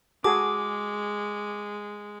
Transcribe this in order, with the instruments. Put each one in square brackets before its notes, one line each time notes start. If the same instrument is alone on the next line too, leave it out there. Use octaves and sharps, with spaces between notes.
[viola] G#3 [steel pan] F#4 G#4 A4 [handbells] D6